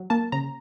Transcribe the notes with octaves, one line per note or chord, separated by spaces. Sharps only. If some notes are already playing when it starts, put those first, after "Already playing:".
Already playing: F#3
A#3 A5
C#3 A#5